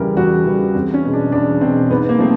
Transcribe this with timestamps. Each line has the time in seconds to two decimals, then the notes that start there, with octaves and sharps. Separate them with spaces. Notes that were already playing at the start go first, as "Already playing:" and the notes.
Already playing: E2 C#3 E3 G3 A#4
0.17 E2 F#4
0.46 C#3 E3 G3
0.74 E2 C4
0.94 C#4
1.03 B2 G#3
1.13 D4
1.32 E2 D4
1.61 B2 G#3 C4
1.90 G#2 B3
2.09 A#3
2.19 F3 A3 C4